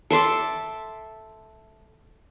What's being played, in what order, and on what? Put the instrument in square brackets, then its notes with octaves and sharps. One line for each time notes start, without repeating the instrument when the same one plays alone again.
[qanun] A4 E5 C6 D6